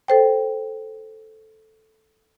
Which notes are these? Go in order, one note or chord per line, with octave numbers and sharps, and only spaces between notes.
A4 C5 G5